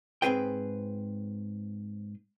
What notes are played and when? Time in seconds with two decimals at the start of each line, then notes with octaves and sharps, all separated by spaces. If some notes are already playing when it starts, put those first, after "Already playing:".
0.22 G#2 C4 G#4 B4 G5